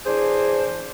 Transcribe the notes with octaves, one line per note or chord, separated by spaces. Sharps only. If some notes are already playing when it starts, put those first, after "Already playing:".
E3 D4 G#4 C5